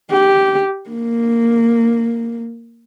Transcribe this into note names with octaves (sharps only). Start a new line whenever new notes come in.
G4
A#3